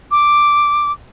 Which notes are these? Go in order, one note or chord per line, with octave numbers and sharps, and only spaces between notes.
D6